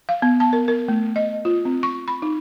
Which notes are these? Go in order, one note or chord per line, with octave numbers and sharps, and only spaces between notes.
F5
B3
A5
A#4
A#4
A3
D#5
F4
C4
C#6
B5
D#4